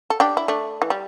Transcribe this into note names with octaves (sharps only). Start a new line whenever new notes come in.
A4
D4 G4
E4
A3 D4
E3
G3